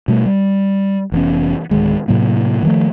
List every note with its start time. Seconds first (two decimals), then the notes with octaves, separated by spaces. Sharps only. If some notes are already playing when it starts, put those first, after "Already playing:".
0.08 B2 G3 A3
0.26 G3
1.12 F1 E3 B3 C#4
1.71 D1 G1 D#3 G#3
2.08 A2 C3 F#3 A#3
2.63 D#3 F3 A3